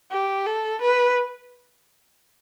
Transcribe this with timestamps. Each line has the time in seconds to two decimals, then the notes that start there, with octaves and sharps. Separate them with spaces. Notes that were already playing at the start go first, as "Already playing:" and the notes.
0.11 G4
0.46 A4
0.81 B4